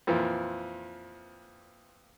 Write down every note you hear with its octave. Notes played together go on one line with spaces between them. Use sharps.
F2 A#2 E3